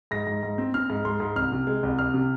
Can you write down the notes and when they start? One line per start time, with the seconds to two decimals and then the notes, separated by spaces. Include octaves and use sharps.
0.11 G#2 A#6
0.27 G#2
0.43 G#2
0.58 C4
0.74 C4 F6
0.90 G#2
1.05 G#2 C6
1.20 G#2
1.36 C2 F6
1.52 C3
1.67 G#3
1.83 C2
1.99 C2 F6
2.14 C3